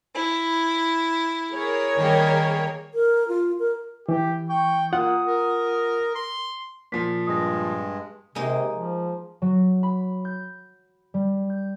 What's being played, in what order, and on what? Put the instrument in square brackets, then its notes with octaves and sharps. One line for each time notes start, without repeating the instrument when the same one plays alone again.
[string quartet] E4
[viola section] G#4 A#4 C#5
[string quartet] D#3 G3 A#3
[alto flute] A#4
F4
A#4
[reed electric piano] E3 [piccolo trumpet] G4
[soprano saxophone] G5 [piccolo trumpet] C#6
[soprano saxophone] A#3 [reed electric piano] F4 F#5 [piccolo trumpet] D#6
[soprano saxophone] A#4
C6
[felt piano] A#2 F3 [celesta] B6
[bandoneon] G2 G#3 [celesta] D#6 A#6
[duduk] C3 [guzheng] G#3 A#3 D#4
[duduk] F3
[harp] F#3
B5
G6
G3
G6